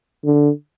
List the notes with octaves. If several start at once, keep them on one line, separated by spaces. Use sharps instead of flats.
D3